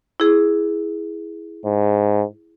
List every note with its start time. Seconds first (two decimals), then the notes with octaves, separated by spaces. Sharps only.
0.20 E4 G#4
1.65 G#2